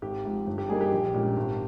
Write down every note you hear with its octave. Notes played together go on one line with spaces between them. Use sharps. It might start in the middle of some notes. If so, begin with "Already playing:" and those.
G#1 G4
G#2 F3
G1
G4
G2 G3 A#3 D#4 G#4
G4
A#1
A#2 G#3 C#4
G#1